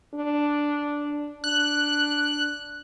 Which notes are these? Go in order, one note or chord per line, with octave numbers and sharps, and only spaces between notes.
D4
D4 F#6